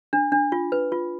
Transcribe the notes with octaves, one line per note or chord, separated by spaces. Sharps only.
D4
D4
F4
B4
F4